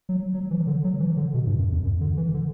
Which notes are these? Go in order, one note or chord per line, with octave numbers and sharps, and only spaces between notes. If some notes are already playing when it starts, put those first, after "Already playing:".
F#3
F#3
E3
D3
F#3
E3
D3
B2
G2
F#2
E2
F#2
D3
E3
D3